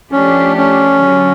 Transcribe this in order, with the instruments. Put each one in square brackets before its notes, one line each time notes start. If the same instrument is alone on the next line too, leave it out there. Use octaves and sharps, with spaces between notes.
[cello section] F3 A3 D4 G4 [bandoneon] C#4
[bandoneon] C#4
[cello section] D3 F#3